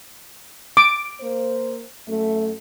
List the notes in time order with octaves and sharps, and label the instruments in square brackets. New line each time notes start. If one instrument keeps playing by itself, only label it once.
[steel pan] D6 [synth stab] D7
[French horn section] A#3 C5
F#2 A3